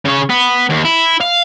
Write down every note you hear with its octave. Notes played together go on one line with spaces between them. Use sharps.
C#3 C#5
B3
D#2
E4
F5